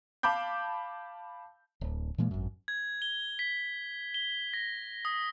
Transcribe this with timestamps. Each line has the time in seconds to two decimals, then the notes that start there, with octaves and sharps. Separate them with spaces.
0.23 F5 A5 B5 D6 G6
1.81 D1
2.18 A#2 E3 G#3 A#3
2.31 G#1 F#2
2.68 G#6
3.02 G7
3.39 B6
4.14 G7
4.54 A#6
5.05 D#6